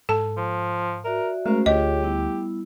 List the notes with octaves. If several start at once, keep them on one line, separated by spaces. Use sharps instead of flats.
G#2 A4 A5
F3
F#4 A#4 D5 E5
G#3 A3 C#4 F#4 A#4 C5
D2 D3 F4 G4 G#4 C#5 D#5
G3 B3 E4